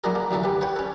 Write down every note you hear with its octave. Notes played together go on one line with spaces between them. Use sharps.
F#3 A3 D4 E4 G#4 A#4
A#3
A1 D2 E3 F#3 A4
G4 B4
B4 C#5 F#5 G5
C#4 A4